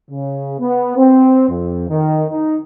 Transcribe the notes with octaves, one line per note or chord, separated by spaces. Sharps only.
C#3
B3
C4
F2
D#3
D#4